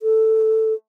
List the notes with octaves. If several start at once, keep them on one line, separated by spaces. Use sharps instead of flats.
A4